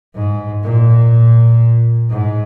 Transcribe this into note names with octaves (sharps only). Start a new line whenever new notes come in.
G#2
A#2
G#2